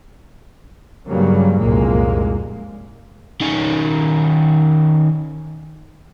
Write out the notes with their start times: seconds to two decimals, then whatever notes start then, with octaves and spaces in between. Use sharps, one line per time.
1.08 G2 C#3 F#3 G3 A#3
1.59 F1 C2 F#2 A#2 G#3 A#3
3.41 D#3 C#4